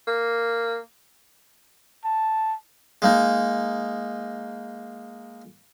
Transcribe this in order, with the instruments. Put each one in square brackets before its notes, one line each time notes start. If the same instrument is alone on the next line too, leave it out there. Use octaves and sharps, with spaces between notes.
[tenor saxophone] A#3
[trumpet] A5
[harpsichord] G#3 A#3 D#4